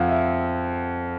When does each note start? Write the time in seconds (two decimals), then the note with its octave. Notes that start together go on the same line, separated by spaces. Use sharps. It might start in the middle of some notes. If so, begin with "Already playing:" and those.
Already playing: F2 F3 F5 F#5
0.09 E5